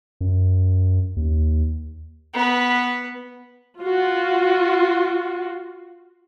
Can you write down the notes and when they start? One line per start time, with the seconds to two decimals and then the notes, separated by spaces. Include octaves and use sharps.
0.21 F#2
1.16 D#2
2.34 B3 B4
3.80 F4 F#4